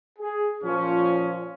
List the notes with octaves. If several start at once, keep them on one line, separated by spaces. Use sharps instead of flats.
G#4
A#2 F3 C#4